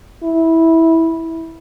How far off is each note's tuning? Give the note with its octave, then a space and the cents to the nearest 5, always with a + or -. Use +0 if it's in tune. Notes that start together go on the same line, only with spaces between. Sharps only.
E4 -15